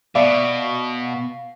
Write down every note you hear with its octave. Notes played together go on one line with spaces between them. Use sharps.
B2 D5 E5 F5